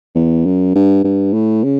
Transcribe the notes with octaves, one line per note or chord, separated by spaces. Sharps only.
E2
F#2
G2
G2
A2
C#3